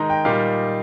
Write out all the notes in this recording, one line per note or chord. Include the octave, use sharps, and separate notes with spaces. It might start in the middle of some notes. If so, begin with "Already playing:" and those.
Already playing: D#3 G#3 D#4 A#5
G5
A#2 G3 A#3 D#4 F5